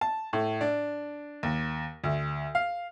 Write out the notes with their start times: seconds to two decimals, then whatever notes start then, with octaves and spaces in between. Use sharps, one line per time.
0.01 A5
0.33 A2
0.61 D4
1.43 D#2
2.04 D2
2.55 F5